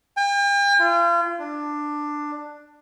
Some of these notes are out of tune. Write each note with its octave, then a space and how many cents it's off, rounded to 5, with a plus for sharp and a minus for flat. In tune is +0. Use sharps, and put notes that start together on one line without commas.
G5 +45
F4 -35
D4 +10